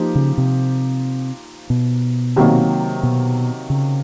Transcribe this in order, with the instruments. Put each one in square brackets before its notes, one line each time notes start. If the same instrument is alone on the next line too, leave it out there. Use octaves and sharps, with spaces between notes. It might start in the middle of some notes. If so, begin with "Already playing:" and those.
Already playing: [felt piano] F3 A#3 D#4 G4
[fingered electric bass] C#3
C3
B2
[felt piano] C3 D#3 F#3 A#3
[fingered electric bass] B2
C#3